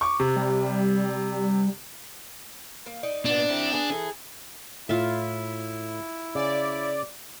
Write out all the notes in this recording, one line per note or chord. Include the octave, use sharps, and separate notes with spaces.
C#6 D6
C3
G3
A#3
D#4 D5
A#2 B3 D4
C4 E4
B3 G#4
E3 A4
A2 E4 F4 E5
C#3 D5